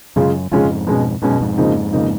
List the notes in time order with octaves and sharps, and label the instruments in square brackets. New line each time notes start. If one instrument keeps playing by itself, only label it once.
[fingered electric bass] F#2 [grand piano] C#3 G#3 C#4 F4
[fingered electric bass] F2 G#2 [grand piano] C#3 G#3 C#4 F4
[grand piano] B2 G#3 C#4
[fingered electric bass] G#2 [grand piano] B2 G#3 C#4
[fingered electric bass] F#2
F2 G#2
[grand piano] C#3 F3 A#3 D#4
C#3 F3 A#3 D#4